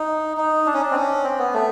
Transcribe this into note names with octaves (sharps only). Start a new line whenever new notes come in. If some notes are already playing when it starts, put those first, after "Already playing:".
Already playing: D#4
D#4
D4
C#4
D4
C4
C#4
C4
B3
A3